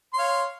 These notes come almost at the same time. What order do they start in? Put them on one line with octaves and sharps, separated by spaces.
C6 C#5 F5